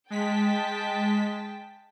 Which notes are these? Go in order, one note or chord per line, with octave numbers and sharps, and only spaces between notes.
G#3 G5 A5 B6